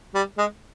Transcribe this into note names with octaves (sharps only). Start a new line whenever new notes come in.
G3
G#3